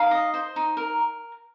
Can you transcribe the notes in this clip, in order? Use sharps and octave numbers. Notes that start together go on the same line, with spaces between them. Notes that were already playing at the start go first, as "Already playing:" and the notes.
Already playing: D#4 F5
D#5
C5
D#4
A#4